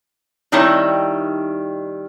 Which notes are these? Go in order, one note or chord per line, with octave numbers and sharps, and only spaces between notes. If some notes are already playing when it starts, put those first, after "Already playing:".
D#3 G3 C4 D#4 E4 C#5